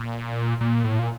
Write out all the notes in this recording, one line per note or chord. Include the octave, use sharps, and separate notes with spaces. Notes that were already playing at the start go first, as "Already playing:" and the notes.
Already playing: A#2
A#2
A2
A#2